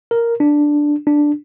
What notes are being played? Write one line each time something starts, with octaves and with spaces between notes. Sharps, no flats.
A#4
D4
D4